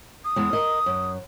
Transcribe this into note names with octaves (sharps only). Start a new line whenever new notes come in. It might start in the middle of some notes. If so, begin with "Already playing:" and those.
D#6
E2 G#3
A#4 D#5
F#2